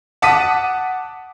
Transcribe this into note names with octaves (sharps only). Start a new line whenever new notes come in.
F#5 A5 D6 D#6 B6 D#7